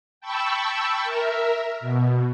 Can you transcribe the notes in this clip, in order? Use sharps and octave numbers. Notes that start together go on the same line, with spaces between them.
G5 A5 B5 C#6 E6
A#4 E5
B2